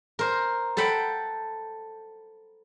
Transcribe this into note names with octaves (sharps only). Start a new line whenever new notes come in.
A#4 C5
A4 F#5 G5 B5